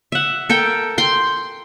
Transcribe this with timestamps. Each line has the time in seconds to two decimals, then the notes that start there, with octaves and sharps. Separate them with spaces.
0.12 E5 F#5
0.50 A4 A#4 G5
0.98 G5 C6